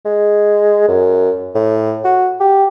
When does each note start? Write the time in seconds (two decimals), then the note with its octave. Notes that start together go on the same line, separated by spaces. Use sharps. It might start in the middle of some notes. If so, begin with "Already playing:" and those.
0.05 G#3
0.88 F#2
1.55 A2
2.04 F#4
2.40 G4